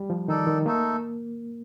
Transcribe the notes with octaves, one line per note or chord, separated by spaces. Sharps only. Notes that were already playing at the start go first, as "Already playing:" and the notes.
Already playing: G3
F3
D#3 D#4 A4 D5
D#3
A3 A#3 D#4 A4